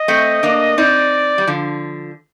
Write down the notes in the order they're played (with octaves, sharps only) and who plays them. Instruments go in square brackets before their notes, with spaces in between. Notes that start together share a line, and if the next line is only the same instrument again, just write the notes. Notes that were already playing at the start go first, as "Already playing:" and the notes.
Already playing: [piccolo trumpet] D#5
[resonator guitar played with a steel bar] A3 C4
A#3 D4
[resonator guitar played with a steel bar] C4 D#4 [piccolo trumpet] D5
[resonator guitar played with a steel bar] G3
D3 F3